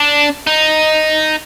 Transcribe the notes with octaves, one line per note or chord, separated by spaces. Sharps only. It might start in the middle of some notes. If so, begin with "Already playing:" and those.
Already playing: D4
D#4